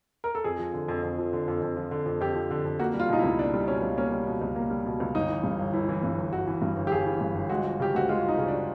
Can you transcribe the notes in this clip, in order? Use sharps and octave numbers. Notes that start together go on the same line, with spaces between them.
A#4
A4
F2 G#4
F3
D3
F2
F2
F3
D3
F2
F2
F3
D3
F2
F2 G4
F3
D3
F2
A#3 F#4
G3
F4
B2 D#4
E4
C#2
A#3 D4
G3
B2 C#4
C#2
A#3 C#4
G3
B2
C#2
A#3
G3
B2
C#2
G1 D#4
E3
G2
G1
G1 E4
E3
G2
G1
G1 F#4
E3
G2
G1
G4
G1 G#4
E3
G2
G1
G#3 F#4
F3
C#3 G4
D2 F#4
G#3 F4
F3 D#4
C#3
D4